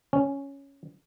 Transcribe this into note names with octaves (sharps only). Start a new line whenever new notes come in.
C#4